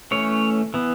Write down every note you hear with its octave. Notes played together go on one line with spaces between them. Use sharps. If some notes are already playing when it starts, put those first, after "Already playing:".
E3 A3 C#4 C#5
E3 B3